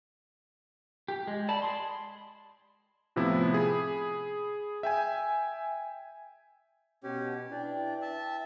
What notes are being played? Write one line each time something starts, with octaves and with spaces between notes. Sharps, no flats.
G4
G#3
D5 A5 B5
G#4 B5 C6
A2 C3 F3 B3 E4
G#4 B5
E5 G5 G#5
B2 C#4 G4
D4 E4 B4 G5
E5 A5